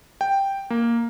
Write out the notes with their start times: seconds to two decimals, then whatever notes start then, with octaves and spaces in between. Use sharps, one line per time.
0.21 G5
0.70 A#3